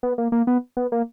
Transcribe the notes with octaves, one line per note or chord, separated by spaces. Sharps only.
B3
A#3
A#3
B3
B3
A#3